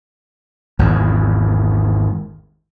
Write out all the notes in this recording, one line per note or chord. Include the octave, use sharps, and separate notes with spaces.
G#1 E2